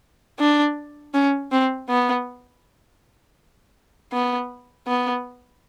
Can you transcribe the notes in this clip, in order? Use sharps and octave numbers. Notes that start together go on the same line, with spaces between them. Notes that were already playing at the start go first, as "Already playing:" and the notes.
D4
C#4
C4
B3
B3
B3